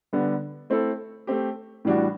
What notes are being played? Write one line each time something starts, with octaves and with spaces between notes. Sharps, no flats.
D3 G3 B3 D4
A3 C4 E4 A4
A3 C4 G4
A2 E3 G3 D4 F#4